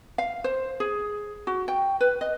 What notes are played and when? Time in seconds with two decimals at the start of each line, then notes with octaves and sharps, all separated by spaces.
0.18 F5
0.44 C5
0.80 G#4
1.47 F#4
1.68 G5
2.01 B4
2.21 D#5